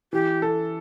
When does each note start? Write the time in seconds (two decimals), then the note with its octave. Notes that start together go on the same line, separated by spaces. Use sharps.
0.13 E3 G4
0.42 A4